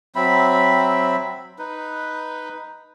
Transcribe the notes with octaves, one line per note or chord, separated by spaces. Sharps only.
F#3 C4 E5 B5
D#4 B4